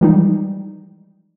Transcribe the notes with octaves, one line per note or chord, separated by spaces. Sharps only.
E3 F3 G3 G#3 D#4